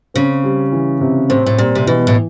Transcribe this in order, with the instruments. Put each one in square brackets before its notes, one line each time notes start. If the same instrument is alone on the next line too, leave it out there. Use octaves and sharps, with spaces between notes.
[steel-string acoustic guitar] C#3 [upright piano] C4
[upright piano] G3
E3
C3
[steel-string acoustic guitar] A2 [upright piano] C4
[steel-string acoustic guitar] A2
[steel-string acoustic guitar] A#2 [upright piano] G3
[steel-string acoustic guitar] C3
[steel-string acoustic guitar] B2 [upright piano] E3
[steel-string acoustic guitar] A2